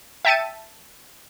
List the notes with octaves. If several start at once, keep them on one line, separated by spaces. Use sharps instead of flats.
E5 G5 A5 A6 C#7 D#7